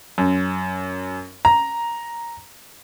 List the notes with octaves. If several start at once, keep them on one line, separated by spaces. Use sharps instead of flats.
F#2
A#5